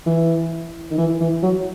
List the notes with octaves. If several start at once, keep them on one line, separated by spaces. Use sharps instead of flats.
E3
D#3
E3
E3
F#3